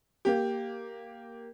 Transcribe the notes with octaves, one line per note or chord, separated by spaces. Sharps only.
A#3 G4